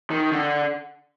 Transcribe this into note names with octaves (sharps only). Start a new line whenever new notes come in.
D#3
D3